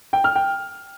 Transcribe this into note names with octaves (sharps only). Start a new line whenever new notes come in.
G5
F6
G5